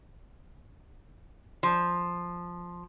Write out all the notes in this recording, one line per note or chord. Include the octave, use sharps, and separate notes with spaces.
F3